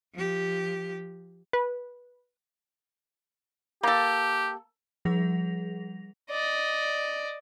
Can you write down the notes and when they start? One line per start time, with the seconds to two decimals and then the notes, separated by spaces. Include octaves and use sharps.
0.14 F3 G4
1.53 B4
3.83 A#3 G4 A4
5.05 F3 G3 G#4 F#5 A#6 F7
6.30 D5 D#5